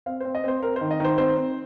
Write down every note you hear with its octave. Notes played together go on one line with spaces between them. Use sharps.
C4 F5
C4 C5
D#5
C4 C5
C4 A#4
C5
D#3
D#5
D#3 C5
C4 C5
C4